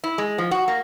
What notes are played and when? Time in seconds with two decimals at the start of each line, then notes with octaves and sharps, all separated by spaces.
0.04 E4
0.18 G#3
0.38 F3
0.51 F#4
0.68 A#3